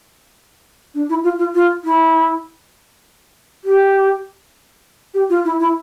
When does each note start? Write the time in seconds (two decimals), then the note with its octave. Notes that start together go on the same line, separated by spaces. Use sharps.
0.94 D4
1.09 E4
1.24 F4
1.39 F4
1.54 F4
1.84 E4
3.64 G4
5.14 G4
5.30 F4
5.45 E4
5.60 E4